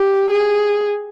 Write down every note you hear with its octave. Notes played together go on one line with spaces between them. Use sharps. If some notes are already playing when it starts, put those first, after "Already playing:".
Already playing: G4
G#4